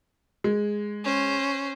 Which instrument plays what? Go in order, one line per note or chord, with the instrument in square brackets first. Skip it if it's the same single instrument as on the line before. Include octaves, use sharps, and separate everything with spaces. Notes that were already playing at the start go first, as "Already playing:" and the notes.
[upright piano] G#3
[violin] C#4 C5